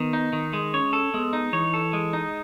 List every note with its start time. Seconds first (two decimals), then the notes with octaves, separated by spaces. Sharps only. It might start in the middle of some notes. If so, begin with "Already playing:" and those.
Already playing: D#3 B3
0.13 D#4
0.33 D#3
0.53 G#3
0.74 C#4 C#5
0.93 A4
1.14 G#3 B3
1.33 D#4
1.53 E3 C#5
1.74 A4
1.93 G#3
2.13 D#4